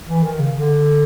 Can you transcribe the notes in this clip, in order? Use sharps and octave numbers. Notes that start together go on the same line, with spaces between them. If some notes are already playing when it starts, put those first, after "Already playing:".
E3
D#3
C#3
D3